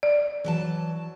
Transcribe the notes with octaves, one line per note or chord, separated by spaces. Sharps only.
D5
E3 F#3 A5